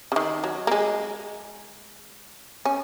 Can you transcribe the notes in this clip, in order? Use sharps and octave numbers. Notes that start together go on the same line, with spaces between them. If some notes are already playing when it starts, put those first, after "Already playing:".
C#3
D#3
F#3
A#3
G#3
C#4